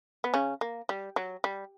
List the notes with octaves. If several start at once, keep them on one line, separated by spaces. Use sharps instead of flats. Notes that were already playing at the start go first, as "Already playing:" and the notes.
B3
C#3 C#4
A#3
G3
F#3
G3